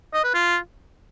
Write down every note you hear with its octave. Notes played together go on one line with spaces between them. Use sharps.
D#5
B4
F4